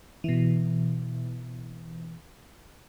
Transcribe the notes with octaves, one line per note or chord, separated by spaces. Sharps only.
B2 E3